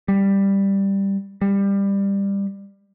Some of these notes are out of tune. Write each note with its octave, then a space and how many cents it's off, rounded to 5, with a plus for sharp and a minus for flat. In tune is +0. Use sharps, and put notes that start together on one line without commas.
G3 +5
G3 +20